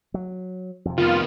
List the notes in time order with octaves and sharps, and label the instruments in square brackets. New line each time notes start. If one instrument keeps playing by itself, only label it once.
[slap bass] F#3
F2 C3
[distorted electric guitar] D#3 B3 [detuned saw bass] F4